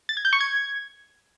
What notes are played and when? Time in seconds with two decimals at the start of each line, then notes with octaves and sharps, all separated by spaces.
0.09 A6
0.17 G#6
0.25 G6
0.33 C#6
0.41 G#6